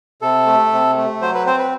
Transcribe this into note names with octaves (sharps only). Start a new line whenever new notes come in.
C3 A4
A3
C3
A3
F#3 C5
B4
C4 C5
B4